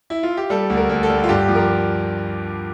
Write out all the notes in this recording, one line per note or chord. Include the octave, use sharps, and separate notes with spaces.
E4
F4
G4
G3 A4
D2
A#4
D2
A4
G3
F4
G2 G4
F3
A#4